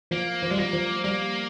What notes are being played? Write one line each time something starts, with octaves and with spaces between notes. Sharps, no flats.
F3 A#3
F3
G3 G#3
F3 A#3
F3
G3 A#3